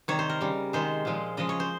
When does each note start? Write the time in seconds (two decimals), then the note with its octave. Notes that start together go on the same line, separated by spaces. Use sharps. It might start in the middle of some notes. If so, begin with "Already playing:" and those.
0.08 C3 D#3 G3 C#5
0.19 C5
0.29 A#4
0.41 C#3 G3
0.73 C3 D#3 G#3 C5
1.05 A#2 F3 G#3
1.37 C#3 F3 G#3 D#5
1.49 C#5
1.60 C5